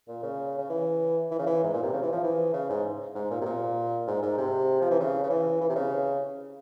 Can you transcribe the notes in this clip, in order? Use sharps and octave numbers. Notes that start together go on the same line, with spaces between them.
A#2
C#3
C#3
E3
E3
C#3
E3
G#2
A#2
C3
C#3
E3
F3
E3
C#3
G#2
G#2
A#2
C3
A#2
G#2
G#2
C3
F3
E3
C#3
C#3
E3
E3
C3
C#3